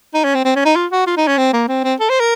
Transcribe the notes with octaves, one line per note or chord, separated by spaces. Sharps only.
D#4
C#4
C4
C4
C#4
D#4
F4
F#4
F4
D#4
C#4
C4
A#3
C4
C4
A4
C5
A#4